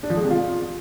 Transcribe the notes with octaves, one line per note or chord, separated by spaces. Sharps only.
D4
F3
G#3
C3
F4